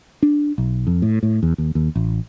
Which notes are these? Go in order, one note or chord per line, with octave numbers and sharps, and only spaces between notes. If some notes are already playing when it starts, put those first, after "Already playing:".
D4
B1
F2
A2
A2
E2
D#2
D#2
A1